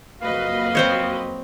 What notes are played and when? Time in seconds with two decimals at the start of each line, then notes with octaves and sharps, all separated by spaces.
0.21 F#1 F2 A#3 F#4 B4 D#5 F5
0.75 C4 C5 C#5